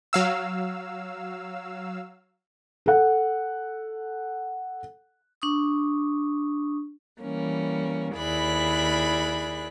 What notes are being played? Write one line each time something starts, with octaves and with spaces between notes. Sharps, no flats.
F#3 F5 E6
A4 F#5
D4 C#6 D#6
E3 G3 A#3 C#4
D#2 E4 G#4 D5 B5 F#6